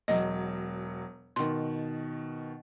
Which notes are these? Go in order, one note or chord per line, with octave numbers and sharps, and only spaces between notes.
E1 F#3 D#5
B2 D#3 C6